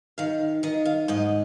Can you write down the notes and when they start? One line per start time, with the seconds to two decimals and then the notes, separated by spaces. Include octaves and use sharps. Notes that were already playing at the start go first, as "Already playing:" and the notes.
0.18 D#3 F5
0.63 D#3 D#5
0.85 F5
1.08 G#2 D#5